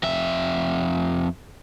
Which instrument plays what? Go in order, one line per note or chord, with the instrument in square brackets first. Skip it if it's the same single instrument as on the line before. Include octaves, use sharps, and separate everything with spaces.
[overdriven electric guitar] F2 E5